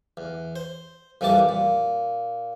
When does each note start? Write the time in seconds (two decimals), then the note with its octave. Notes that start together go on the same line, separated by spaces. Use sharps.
0.17 E2
0.56 C5
1.21 F2 A#2 E3 G3 A5 D6
1.49 A#2